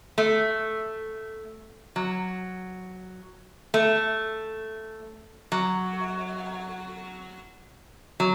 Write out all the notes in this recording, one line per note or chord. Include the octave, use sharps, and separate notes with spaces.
A3
F#3
A3
F#3
F#3